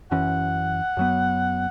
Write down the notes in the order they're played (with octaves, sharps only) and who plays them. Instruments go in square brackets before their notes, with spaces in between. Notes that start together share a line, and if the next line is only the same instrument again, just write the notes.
[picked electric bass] F#2 E3 C#4 [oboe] F#5
[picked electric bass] F#2 F#3 B3